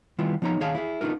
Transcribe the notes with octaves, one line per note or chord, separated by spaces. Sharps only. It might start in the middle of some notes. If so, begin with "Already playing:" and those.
D#3 G3 B3 E4 F4
F3 B3 D#4 C#5 A#5
D#2 D#3 G#4 C#5 F5 A5
E4 G#4
B3 D4 D#4 F4 A#4